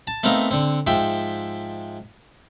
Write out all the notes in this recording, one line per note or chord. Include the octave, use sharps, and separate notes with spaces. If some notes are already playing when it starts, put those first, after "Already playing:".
A5
A3 B3 C4 D#4 A#4 F5
D3 C4
G#2 F3 E5 G5